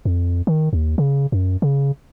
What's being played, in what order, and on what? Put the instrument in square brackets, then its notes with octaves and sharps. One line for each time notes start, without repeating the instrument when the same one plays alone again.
[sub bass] F2
D#3
D#2
C#3
F#2
C#3